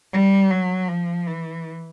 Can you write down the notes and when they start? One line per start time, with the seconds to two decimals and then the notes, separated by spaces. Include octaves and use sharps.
0.13 G3
0.50 F#3
0.88 F3
1.27 E3